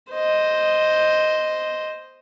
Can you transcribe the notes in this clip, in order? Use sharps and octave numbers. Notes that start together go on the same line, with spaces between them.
C5 D#5